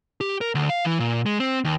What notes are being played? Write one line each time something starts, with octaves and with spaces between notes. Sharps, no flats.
G4
A#4
D2
F5
E3
A#2
G#3
C4
D#2